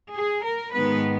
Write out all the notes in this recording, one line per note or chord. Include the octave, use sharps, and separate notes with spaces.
G#4
A#4
G#2 D#3 G#3 B3 B4